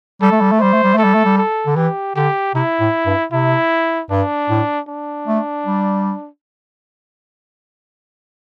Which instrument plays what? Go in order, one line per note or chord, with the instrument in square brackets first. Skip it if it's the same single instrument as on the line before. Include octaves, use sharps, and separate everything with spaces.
[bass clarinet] G3 [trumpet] A4
[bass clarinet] A3
G3
A3
[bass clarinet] G3 [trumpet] C5
[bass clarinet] A3
G3
[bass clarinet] A3 [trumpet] A4
[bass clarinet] G3
A3
G3
[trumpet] A4
[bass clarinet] D3
[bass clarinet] E3 [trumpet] G4
[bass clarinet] D3 [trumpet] G4
[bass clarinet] C3 [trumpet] E4
[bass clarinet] A2
G2
[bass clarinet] C3 [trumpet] E4
[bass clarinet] G2 [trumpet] D4
[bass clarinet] A2
[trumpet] D4
[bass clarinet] A3
G3